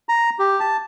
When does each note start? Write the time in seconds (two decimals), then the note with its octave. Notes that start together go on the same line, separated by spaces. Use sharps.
0.09 A#5
0.39 G4
0.60 A5